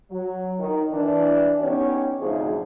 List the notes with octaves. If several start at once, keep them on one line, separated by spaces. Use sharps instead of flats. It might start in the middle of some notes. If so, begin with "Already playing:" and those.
F#3
D#3
E3 D4
B3 C#4 D#4 G4 C#5
D2 G#2 C3 F3 F#3 G#4